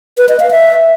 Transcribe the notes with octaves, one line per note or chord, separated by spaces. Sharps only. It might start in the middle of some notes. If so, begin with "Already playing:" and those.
B4
D#5
F5
E5